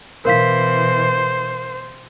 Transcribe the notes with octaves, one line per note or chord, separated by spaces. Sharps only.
B2 E3 A#4 C5 F5 B6